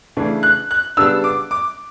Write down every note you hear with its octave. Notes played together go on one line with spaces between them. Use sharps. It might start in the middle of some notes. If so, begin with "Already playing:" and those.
C#3 E3 A3 D4
F#6
F#6
C#3 G3 B3 D4 E6
D6
D6